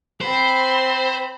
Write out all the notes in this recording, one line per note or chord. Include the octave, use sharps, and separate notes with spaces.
C4 C5 B5